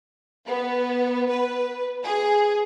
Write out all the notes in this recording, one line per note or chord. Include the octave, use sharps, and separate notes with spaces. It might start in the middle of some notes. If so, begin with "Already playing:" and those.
B3
B4
G#4